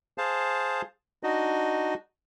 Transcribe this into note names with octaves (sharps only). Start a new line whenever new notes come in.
G#4 C5 F5 A5
D4 D#4 F#4 D#5